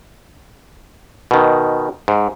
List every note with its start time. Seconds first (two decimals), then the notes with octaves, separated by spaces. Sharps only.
1.31 B2 D#3
2.08 G#2